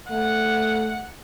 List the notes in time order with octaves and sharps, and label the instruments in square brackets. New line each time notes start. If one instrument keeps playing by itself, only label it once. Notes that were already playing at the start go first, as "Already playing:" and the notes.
[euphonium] A3 [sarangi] F#5